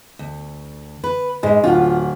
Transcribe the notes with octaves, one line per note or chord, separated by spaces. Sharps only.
D2
B4
G#2 G#3
D1 F4 F#5